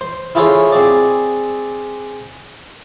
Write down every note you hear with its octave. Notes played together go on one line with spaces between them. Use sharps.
C5
E4 F4 G#4 A4 C5 C#5
C4 G#4 D5